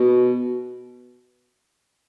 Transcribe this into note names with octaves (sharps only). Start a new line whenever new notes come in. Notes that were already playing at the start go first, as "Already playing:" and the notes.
Already playing: B2